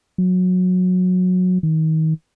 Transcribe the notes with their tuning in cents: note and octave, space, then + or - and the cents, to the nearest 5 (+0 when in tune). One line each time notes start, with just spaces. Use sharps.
F#3 -20
D#3 +30